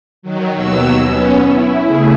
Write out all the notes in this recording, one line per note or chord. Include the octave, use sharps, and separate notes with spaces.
D#3 F#3
D#2 B2 F#3 E6
B3 C#4
E4
C#3 A3 E4 G#4